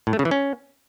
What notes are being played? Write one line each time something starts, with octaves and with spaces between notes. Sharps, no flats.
A2
A3
C#3
E3
C#4